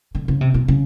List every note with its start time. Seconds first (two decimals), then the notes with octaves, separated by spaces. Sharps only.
0.15 D3
0.28 C#3
0.41 C3
0.54 B2
0.68 C#3